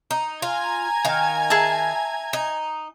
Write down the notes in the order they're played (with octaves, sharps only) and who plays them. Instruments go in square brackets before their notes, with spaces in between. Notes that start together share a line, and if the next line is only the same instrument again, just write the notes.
[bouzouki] D#4
[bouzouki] F4 [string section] G#5 A#5 G#6
[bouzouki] D#3 F5
[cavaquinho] G#4 E5 A5
[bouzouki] D#4